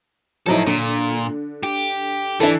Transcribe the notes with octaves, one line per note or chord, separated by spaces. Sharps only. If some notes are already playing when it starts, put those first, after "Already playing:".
F3 F#3 D#4 E4 A4
A#2 D3
G4
E3 D4 A4